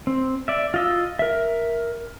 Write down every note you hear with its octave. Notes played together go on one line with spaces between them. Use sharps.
C4
D5 E5
F4 D#5 E6
A#4 E5